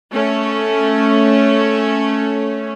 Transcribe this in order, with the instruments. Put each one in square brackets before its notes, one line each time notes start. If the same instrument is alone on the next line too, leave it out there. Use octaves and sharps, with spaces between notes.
[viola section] A3 C#4